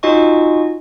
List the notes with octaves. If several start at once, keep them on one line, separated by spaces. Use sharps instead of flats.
D#4 F4 F#4 D#5 G#5 C#6